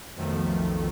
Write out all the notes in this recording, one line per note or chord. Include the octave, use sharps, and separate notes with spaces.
B1 F2 B2 D#3 F3 A3